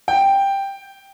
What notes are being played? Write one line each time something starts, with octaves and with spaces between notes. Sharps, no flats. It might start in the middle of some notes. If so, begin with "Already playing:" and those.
G5